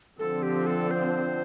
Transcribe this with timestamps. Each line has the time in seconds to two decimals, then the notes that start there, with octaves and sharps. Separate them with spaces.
0.19 D3 F3 C4 A4
0.43 G4
0.66 A4
0.91 C5